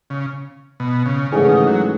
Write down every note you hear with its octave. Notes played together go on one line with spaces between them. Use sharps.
C#3
B2
C#3
G#2 C#3 E3 A3 C#4 G#4
D#3
F#3